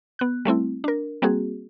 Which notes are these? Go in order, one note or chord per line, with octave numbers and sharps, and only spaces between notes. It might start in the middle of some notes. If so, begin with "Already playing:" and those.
B3 F#6
G3 A3 C4 E4
D4 A#4
G3 A#3 C4 F#4 G#4